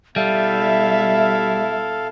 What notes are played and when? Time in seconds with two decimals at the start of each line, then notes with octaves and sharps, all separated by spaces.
0.16 B2 G3 E4 A4 E5 F5